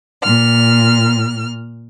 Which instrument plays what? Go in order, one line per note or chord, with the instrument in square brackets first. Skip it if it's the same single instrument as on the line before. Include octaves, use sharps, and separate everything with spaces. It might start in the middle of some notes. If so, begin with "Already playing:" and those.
[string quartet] A#2 F6